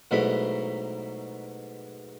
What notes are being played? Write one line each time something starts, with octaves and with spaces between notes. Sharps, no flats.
G#2 B2 F#3 A3 E4 B5